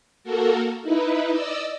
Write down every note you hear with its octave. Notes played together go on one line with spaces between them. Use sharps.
A#3 F#4 A4 A#4
D#4 E4 B4
D5 D#5 E6